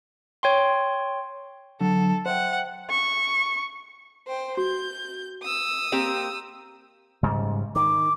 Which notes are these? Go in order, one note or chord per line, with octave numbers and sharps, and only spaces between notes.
C#5 G5 C6
D3 F#3 A4
C5 E5 F#5 G5
C#6
C5 G5
F#4 G6
D#6 E6
A#3 C4 G4
G#2 C#3 G3
D#3 D6